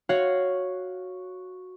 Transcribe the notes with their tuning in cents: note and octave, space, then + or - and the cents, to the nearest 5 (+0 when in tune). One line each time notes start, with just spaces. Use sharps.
F#4 -5 C#5 +0 F5 +0